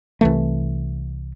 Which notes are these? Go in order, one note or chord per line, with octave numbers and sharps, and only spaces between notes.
C2 E3 A3